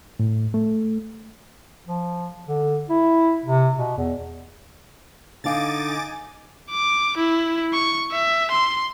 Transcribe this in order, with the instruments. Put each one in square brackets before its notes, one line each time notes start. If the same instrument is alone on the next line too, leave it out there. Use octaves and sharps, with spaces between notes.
[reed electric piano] A2
A3
[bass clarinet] F3
D3
E4
C3
B2
E2
[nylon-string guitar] D3 F5 [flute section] D#4 G#5 [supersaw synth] D6 A6
[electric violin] D6
E4
C#6
E5
C6